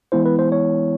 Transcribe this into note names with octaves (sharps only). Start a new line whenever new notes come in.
E3 G#3 B3 E4 C5
B4
C5
C#5